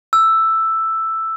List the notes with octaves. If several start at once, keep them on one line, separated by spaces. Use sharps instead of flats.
E6